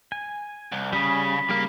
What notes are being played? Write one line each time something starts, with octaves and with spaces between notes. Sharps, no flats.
G#5
C2
C#3 G3 G#4 B5
C#3 G3 A#3 F5